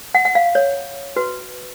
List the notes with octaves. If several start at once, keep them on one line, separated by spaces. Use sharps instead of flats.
F#5
F#5
F5
C#5
F#4 B4